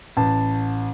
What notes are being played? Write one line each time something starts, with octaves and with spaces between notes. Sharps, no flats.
A1 A5